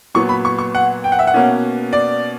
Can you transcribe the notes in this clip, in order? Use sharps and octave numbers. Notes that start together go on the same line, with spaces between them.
A#2 F#3 B3 C#6
B5
C#6
C#6
F#5
G5
F#5
E5
F#5
B2 A#3 C#4
D5